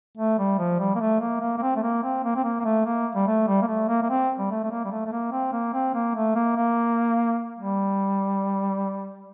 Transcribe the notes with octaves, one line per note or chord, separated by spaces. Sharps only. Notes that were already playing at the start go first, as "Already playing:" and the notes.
A3
G3
F3
G3
A#3
A3
A#3
A#3
A#3
C4
A3
A#3
C4
A#3
C4
A#3
A#3
A3
A#3
G3
A3
G3
A#3
A3
A#3
A#3
C4
G3
A3
A3
A#3
G3
A3
A3
A#3
C4
A#3
C4
A#3
A3
A#3
A#3
G3